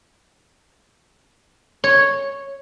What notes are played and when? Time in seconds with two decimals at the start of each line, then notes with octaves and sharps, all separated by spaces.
1.84 C#5